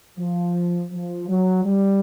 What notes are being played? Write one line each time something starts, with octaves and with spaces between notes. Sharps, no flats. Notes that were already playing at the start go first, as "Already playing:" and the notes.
F3
F3
F#3
G3